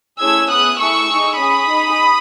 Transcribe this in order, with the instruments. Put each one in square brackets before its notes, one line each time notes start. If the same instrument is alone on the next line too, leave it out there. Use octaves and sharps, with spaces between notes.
[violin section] A3 C#4 E4 G#4 E6 G#6
B3 E4 G#4 D#6 F#6
A3 E4 G#4 C#6 E6
D#4 G#4
C#4 G#4 B5 D#6
D#4 G#4